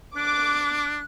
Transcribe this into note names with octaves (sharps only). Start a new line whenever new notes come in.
D4 D6 F#6